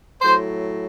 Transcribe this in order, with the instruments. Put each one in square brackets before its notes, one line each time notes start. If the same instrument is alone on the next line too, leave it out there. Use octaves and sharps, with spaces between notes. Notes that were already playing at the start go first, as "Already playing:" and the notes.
[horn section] A2 F#3 C5